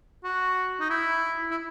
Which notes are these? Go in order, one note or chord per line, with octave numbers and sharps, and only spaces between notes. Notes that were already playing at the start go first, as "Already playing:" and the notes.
F#4
D#4
E4
E4